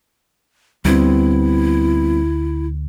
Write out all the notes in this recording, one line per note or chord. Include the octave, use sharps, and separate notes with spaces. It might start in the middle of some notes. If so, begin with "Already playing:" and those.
D2 G3 B3 C4 E4